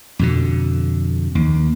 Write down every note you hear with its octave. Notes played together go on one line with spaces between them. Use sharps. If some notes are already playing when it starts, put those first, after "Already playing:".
F2 B2 D3
D#2